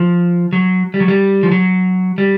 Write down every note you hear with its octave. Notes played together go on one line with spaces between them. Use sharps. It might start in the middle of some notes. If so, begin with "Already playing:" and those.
Already playing: F3
F#3
G3
F#3
G3
F3
F#3
G3